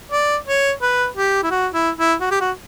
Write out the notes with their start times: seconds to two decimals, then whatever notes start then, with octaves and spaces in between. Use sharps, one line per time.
0.12 D5
0.47 C#5
0.82 B4
1.16 G4
1.43 E4
1.51 F#4
1.74 E4
1.98 E4
2.21 F#4
2.31 G4
2.41 F#4